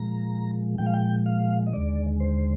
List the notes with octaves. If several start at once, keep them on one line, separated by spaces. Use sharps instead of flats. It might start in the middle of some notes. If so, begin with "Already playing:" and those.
Already playing: A#2 F3 G#3 A#5
A#2 F3 G#3 G5
F5
G5
F5
D#5
D#2 D3 G#3 D5
C5